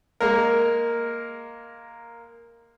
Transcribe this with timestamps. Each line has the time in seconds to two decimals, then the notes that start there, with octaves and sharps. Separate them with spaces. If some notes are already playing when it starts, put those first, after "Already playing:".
0.20 G#3 A#3 A#4